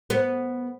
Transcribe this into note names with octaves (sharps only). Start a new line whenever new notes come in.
B3